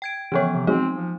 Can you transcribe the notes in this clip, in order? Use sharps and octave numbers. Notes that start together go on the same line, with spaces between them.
G5 G#6 D7
C#3 E3 F3 B3 C#5
C3
F#3 G#3 C4 D#4
F3